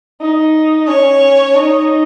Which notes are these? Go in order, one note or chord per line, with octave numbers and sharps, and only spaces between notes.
D#4
C#4 C#5
C#4
D#4